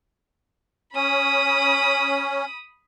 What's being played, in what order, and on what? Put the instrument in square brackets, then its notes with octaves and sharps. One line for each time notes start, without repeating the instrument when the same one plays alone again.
[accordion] C#4 [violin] B5 D#6